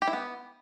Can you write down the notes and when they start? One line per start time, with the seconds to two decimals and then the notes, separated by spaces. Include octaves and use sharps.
0.02 G4
0.07 E4
0.13 B3